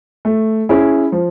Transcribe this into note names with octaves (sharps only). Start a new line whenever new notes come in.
A3
C#4 E4 G#4
F3